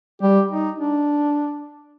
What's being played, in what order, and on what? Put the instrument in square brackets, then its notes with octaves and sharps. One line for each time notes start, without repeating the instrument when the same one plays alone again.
[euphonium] G3 [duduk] G4
[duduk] D#4
D4